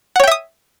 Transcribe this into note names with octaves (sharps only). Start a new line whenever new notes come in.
C#5 E5 F#5 G5 D#6